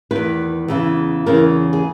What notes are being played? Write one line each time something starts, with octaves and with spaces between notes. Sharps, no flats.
E2 D#3 B4
E2 C#3 E3
E2 C#3 E3 A#4
G#4